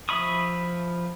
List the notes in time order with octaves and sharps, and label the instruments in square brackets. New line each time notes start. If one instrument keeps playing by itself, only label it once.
[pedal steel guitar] F3 E5 B5 C#6 D#6